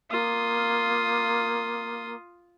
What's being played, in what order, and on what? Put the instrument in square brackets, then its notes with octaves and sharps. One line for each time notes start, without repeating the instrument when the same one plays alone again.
[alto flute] A#3 [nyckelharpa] F4 D#6